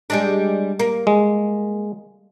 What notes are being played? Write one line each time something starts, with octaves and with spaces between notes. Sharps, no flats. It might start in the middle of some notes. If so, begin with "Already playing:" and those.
G3 G#3 D4
A#3
G#3